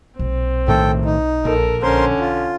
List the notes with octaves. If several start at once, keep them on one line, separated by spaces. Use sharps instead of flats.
B1 A#2 C4
A2 D#3 A3 A4 G5
D#4
A#1 A4 A#4
D3 C#4 A#4 C5 C6
F4